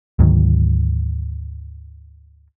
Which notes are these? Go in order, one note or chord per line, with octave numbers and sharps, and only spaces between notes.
D2 G#2 D#3 F#3